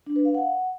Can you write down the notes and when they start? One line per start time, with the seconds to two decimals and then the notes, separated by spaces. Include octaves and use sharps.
0.07 D4
0.16 B4
0.25 F5
0.34 F#5